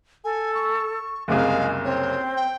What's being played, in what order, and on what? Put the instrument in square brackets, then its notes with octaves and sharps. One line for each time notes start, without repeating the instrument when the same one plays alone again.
[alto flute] A4 [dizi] G#5
[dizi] C#6
[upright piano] F#1 C2 [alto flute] G#3 [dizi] F5
[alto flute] C4 [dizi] C#5
[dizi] G5